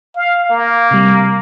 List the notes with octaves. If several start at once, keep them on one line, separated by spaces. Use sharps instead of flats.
F5
A#3
C3 G3